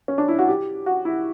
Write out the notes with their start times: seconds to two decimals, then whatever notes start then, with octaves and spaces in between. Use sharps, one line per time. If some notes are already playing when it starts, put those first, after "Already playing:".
0.08 C#4
0.18 D4
0.28 E4
0.39 F#4
0.48 G4
0.86 F#4
1.05 E4